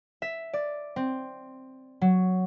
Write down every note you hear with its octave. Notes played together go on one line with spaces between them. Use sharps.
E5
D5
C4
F#3